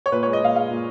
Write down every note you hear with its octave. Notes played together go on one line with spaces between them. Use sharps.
C#5
A#2 B4
G#3 C#5
D#5
A#2 F5
G#3 F5
A#2